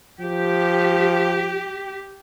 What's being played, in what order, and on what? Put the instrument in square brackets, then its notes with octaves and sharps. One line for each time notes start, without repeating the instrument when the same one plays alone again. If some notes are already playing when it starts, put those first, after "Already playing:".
[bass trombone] F3 [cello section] G4